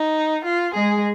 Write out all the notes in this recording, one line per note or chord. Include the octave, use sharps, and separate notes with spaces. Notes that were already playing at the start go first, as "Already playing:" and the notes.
Already playing: D#4
F4
G#3 G#4